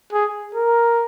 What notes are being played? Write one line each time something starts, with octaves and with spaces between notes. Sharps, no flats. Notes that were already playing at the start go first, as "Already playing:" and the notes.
G#4
A#4